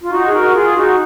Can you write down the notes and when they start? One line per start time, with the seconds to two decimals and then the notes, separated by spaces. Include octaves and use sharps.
0.03 F4
0.10 D#4 F#4
0.27 G#4
0.33 F#4 A#4
0.54 F4 G#4
0.75 D#4 F#4